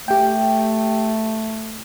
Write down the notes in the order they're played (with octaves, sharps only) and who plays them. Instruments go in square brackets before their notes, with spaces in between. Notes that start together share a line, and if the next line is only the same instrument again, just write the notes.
[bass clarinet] A3 [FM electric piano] G4 G5